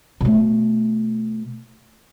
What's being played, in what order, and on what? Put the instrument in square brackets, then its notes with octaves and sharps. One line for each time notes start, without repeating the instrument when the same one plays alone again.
[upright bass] B2 A3